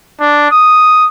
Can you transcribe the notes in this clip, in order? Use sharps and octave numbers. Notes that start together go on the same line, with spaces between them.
D4
D#6